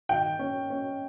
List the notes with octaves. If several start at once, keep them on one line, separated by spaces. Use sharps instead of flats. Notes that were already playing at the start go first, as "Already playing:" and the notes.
D#3 G5
C#4
C#4